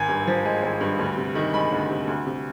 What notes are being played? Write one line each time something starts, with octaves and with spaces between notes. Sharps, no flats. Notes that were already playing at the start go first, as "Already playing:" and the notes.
Already playing: G#1 G#5
G2
F3
G#3
G#1
G2
D2
C3
D#3
G#3 B5
D2
C3
D2
C3